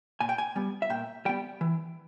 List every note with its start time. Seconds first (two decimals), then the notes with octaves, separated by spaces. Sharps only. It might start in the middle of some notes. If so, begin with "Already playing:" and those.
0.21 A#2 G#5
0.29 G5
0.38 G#5
0.56 G3 B3
0.82 E5
0.90 A#2 G5
1.25 G3 B3 G5
1.61 E3